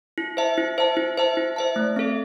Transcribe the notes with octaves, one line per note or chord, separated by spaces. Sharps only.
E4
C5 E5 A5
E4
C5 E5 A5
E4
C5 E5 A5
E4
C5 E5 A5
A3
C4 A4 E5